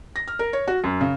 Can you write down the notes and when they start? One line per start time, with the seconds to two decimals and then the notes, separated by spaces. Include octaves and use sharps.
0.16 A#6
0.28 F6
0.39 A#4
0.53 C#5
0.67 F#4
0.84 F#2
1.01 C#3